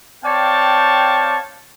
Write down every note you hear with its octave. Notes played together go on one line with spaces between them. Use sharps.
C4 C#5 D5 F5 G5 A5